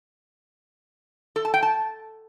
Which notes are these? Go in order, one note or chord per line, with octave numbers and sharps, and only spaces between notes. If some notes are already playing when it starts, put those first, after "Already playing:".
A4
A5
G5
A5